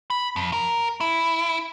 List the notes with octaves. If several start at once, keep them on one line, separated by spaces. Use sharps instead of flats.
B5
F2
A#4
E4